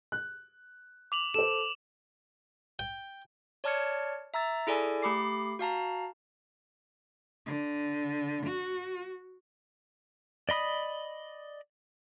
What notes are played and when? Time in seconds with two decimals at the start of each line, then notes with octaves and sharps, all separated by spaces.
0.12 F#6
1.12 D6 F7 F#7
1.34 A4 C5 E7
2.79 G5
3.64 C#5 D5 A5 F6 G#6 C#7
4.34 E5 A#5 E6 A6
4.67 E4 G#4 A4 D5 G#5
5.02 A3 G4 B5 D6 C7
5.59 F#4 F5 A5 A#5
7.46 D3
8.46 F#4
10.49 D5 D#5 B5 D#6